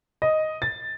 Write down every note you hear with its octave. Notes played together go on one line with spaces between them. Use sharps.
D#5
A6